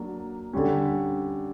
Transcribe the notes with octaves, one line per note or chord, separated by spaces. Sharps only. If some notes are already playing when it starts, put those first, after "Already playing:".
Already playing: F#3 A#3 D4
D3 G3 C#4